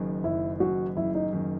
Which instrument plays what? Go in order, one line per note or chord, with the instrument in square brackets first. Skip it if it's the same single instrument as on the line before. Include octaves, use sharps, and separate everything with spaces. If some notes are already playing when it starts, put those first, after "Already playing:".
Already playing: [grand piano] F#1 F#2 D#3
[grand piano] F#1 [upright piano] E4
[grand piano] F#2 D#3 [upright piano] F#4
[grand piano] F#1 [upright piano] E4
[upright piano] D#4
[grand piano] F#2 D#3